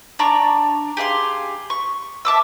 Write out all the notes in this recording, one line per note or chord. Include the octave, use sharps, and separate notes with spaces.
D4 D5 A#5 C#6
G4 G#4 F5 C6
C#6
E5 A5 D6 E6